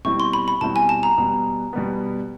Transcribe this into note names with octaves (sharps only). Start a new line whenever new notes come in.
B2 G3 C4 E4 C#6
C6
B5
B5
B2 G3 C4 E4 A5
G#5
A5
A#5
B2 G3 B3
B2 G3 B3